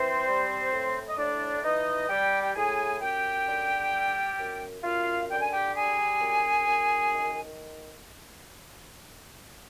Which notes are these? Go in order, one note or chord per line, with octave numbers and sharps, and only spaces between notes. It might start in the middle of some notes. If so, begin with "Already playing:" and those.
Already playing: E3 C4 C5
G3
A2
D#5
A2 D4 D5
E3 D#4 D#5
G3 G4 G5
G5
A2 G#4 G#5
F#2 G4 G5
D3
G3
F#2
F#2 F4 F5
D3 G5
G#5
G4 G5
G3 G#4 G#5
F#2
F#2
D#3